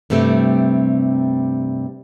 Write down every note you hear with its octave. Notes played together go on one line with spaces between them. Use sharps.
G2 C3 G3 A3 C4